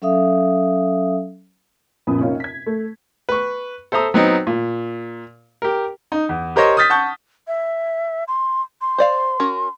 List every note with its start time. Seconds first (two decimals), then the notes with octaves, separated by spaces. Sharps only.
0.02 F#3 C#4 A4 E5 F5 D#6
2.07 F#2 A#2 F3 B3 B5 D#6
2.19 C3 A#3 C4 C#4 D#4 F4
2.40 G#6 B6
2.66 A3
3.29 B4 C#6
3.92 A4 C5 E5 A#5 D#6
4.14 F#3 B3 C4 D#4
4.47 A#2
5.62 G4 A#4
6.12 D#4
6.29 E2
6.56 G4 A#4 C5 C#5 D#5
6.77 D#6 F6 G6 A6 B6
6.90 F#5 A5 C#6 G6
7.48 E5
8.28 C6
8.81 C6
8.98 C5 D5 F5
9.40 C#4 F#4 A#4